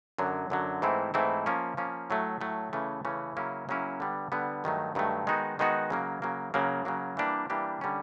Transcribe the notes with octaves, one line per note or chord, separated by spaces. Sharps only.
F#2 D3 F#3
F#2 D3 F#3
G#2 E3 A3 C4 E4
G#2 E3 A3 C4 E4
F3 A#3 C#4
F3 A#3 C#4
A2 F#3 A3
A2 F#3 A3
C#3 E3 A3 C#4
C#3 E3 A3 C#4
C#3 F#3 A#3 C#4 E4
C#3 F#3 A#3 C#4 E4
D3 G3 B3
D3 G3 B3
G2 D#3 F#3 A3
G2 D#3 F#3 A3
D#3 G#3 B3 D#4 F#4
D#3 G#3 B3 D#4 F#4
C#3 F#3 A#3
C#3 F#3 A#3
C#3 F#3 A#3
C#3 F#3 A#3
E3 G3 A#3 D4 G4
E3 G3 A#3 D4 G4
D3 G3 A#3 C#4